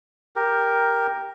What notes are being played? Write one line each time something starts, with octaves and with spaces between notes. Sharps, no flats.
G4 A#4